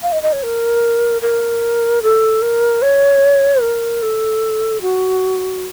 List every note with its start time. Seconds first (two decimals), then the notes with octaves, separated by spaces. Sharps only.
0.02 F5
0.12 D#5
0.23 D#5
0.33 C#5
0.43 A#4
1.22 A#4
2.03 A4
2.42 A#4
2.82 C#5
3.61 A#4
4.02 A4
4.82 F#4